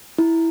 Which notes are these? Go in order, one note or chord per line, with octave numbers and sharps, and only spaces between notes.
E4